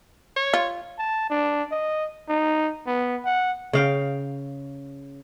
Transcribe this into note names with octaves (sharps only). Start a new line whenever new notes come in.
C#5
F4
A5
D4
D#5
D#4
B3
F#5
C#3 F5 G5